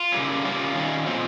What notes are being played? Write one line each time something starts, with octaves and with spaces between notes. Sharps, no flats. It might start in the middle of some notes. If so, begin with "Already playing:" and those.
Already playing: F4
C#3 G3 A#3 C#4
C#3 G3 A#3 C#4 F4
D#3 G3 C#4
A#2 F3 G#3 C4